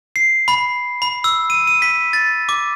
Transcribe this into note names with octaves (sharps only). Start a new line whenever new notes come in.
C7
B5
B5
E6
D#7
D#7
B6
A6
D6